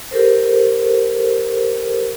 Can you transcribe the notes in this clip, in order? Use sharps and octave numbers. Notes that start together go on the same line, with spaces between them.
G4 A4 A#4 C5